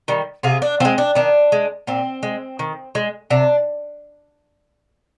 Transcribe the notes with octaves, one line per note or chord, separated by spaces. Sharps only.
D#3 G3
C3 F4 G#4
D4
F3 G#3 C4
D4
D#3 D4
G#3
A#2 C4
G#3
D#3
G#3
C3 D4